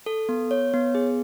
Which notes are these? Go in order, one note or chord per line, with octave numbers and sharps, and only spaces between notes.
A4
B3
C#5
B3
G#4